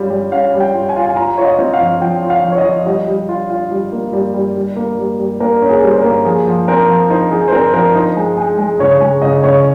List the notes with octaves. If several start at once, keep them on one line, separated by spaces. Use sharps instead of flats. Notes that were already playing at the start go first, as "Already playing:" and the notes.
Already playing: G3 C#4 F4
G3
C#4 F5
G3
G5
F4
G#5
F4
G#5
F4 A#5
F4 C#5
D#5
C4
F5
F3
F3 G5
F4
F5
F3
C#5
D#5
F3
G3 D#5
G3
F4
F4
G3
A#3
G3
G3
G3
A#3
G3
G3
A#3 A#4
C#4
G#4
G3
C5
A#4
A#3
F3 G#4
F3
C4 A#4
F3
D#4 C5
F3 G#4
C5
C4 A#4
F3 A#4
D#4 C5
G#3
G#3
G#3
C#3 C#5
G#3
C#3 D#5
C#3 C#5